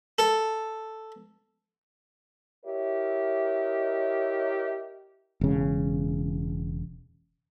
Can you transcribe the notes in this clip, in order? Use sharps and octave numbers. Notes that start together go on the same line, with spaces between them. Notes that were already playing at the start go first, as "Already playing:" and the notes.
A4
E4 G4 A#4 C#5 D#5 E5
E1 C#3